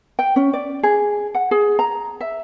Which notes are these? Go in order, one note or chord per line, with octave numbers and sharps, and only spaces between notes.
G5
C#4
D5
G#4
F#5
G#4
A#5
E5